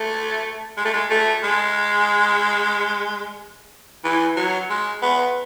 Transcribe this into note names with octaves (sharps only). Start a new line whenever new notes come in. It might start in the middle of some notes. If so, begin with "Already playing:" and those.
Already playing: A3
G#3
A3
G#3
A3
G#3
E3
F#3
G#3
B3